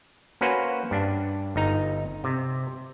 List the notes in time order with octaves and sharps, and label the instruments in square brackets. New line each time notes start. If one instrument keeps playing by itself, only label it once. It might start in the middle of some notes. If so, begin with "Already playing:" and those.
[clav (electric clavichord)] A#3 C#4 F#4 B4 C5
G2 D4
G1 D#4 A#5
C3